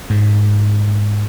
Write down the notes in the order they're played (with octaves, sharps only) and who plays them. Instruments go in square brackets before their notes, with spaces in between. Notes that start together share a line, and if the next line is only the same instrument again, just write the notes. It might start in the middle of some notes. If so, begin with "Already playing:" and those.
[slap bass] G#2